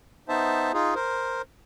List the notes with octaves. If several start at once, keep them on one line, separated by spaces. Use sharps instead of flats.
B3 D#4 C5 E5 A5
D#4 F4 G#4
A#4 C5